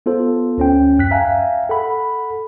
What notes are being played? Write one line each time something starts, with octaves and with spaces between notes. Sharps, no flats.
B3 F4 A4 C5
D2 C#4 G5
F#2 F#6 B6
E5 F5 G5 G#5 A#5
A4 F#5 B5